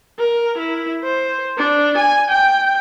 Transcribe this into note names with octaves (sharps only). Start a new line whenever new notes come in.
A#4
E4
C5
D4
G#5
G5